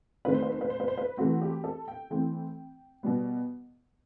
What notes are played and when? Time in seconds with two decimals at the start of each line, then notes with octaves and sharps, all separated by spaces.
0.25 D#3 A3 C4 B4
0.34 C5
0.42 B4
0.52 C5
0.61 B4
0.70 C5
0.80 B4
0.88 C5
0.98 B4
1.17 E3 A3 C4 F#4
1.42 G4
1.64 A4
1.88 G5
2.10 E3 A3 C4 G5
3.03 B2 G3 B3